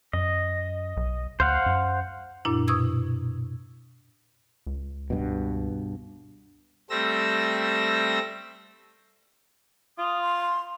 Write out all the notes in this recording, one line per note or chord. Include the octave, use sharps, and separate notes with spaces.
F#2 D#5
B1
D2 C5 F5 F#5
F#2
F#2 A#2 D4 E4
B2 C#6 D#6 E6 G#6
C#2
G2 B2
G3 A3 C4 E6 A#6
F4 D#6
C6